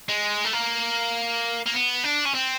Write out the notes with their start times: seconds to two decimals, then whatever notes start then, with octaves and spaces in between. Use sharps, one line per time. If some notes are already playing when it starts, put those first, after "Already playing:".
0.08 G#3
0.45 A3
0.53 A#3
1.66 A#3
1.74 B3
2.04 D4
2.25 C#4
2.34 C4